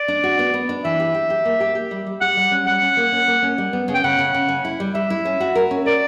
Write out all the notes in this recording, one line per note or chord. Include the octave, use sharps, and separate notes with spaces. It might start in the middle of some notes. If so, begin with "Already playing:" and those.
Already playing: D5
D4
F#4
B3
B3
D4
E3 E5
G4
G4
G4
A#3
G4
G4
G3
G3
G4 F#5
G3
C#4
G3 F#5
C#4
A#3
C#4
A#3
C#4
G3
B3
C#3
G5
C#3 F#5
C#3
C#3
C#4
E4
G3
G3 E5
E4
C#4
F#4
A#4
C#4
A#4 D5